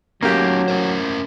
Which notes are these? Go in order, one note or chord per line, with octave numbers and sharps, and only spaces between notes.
F#3 A3 A#3 C#4 D#4 G4
C#4 A#4 C5